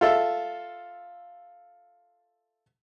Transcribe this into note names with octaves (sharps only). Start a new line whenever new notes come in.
F4 A4 E5